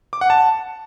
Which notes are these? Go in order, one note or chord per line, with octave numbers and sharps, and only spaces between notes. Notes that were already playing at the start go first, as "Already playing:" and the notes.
D6
F#5
A5